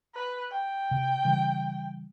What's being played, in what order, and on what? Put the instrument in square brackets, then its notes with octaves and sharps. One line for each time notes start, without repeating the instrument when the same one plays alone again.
[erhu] B4
G5
[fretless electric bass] C3
C#3 E3 G3